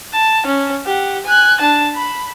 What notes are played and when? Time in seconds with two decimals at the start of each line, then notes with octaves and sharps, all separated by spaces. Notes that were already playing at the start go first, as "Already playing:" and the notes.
0.13 A5
0.46 C#4
0.86 G4 F#5
1.25 G#5 F#6
1.60 D4 A5
1.95 B5